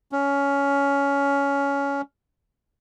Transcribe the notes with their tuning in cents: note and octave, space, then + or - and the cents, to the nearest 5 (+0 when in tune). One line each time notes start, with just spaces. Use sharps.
C#4 +15